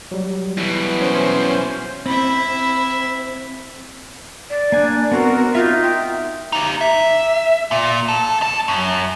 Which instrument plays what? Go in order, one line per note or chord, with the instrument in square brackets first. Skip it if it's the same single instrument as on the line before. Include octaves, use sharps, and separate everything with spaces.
[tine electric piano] F#3 G3
[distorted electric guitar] E2 B2 [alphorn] E3
[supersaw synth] C#4 C5
[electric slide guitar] C4 [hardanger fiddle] E4 E5
[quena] D5
[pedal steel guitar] A#3 G#5 [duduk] D4
[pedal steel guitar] B3 C4 [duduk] F#4 [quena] A#4
[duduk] D#4 [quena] F4 [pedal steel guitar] E5 F6
[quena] G5
[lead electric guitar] D#4 G4
E5
A#2
A4
F2 A5
F#2